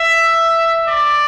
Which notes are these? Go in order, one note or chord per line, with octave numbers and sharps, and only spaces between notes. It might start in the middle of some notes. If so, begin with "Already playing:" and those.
Already playing: E5
D5